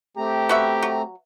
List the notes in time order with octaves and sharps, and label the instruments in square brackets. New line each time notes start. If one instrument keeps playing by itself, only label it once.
[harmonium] A3 C4 A#5 [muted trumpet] G4
[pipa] B3 F#4 E5
F#3